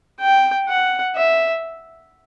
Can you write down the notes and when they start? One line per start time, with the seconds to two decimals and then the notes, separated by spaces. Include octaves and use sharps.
0.20 G5
0.68 F#5
1.16 E5